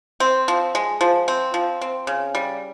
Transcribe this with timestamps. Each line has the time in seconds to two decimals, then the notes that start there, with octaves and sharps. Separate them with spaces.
0.20 C4
0.48 F3
0.75 G#3
1.01 F3
1.28 C4
1.54 F3
1.82 C4
2.07 C#3
2.35 G3